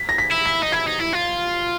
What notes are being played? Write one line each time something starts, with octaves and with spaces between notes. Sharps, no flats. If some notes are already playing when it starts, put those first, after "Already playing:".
Already playing: B6
A#6
B6
E4
B6
D#4
E4 G#6
D#4
E4
F4